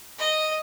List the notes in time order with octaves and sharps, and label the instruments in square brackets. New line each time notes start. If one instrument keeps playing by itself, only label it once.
[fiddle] D#5